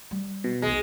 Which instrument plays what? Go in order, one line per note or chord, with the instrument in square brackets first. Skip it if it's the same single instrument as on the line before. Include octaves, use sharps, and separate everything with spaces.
[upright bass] G3
[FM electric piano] B2
[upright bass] B1 E2 [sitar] G#3